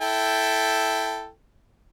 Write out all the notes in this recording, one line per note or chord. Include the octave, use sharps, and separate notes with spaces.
E4 A4 G5